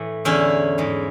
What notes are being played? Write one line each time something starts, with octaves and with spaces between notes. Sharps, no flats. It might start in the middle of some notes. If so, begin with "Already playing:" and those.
Already playing: A2 E3
E2 D3 C#4 E4
G#2 E3